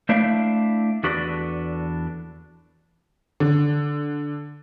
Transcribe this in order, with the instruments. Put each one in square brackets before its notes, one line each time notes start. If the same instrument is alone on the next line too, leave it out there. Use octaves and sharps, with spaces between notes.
[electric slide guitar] A3 D4 E4 C5 E5 F5
E2 D4 F#4 A4 B4
[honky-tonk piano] D3